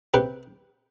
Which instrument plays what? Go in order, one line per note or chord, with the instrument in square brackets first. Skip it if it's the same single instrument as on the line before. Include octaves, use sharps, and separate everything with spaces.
[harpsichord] C3 G4 B4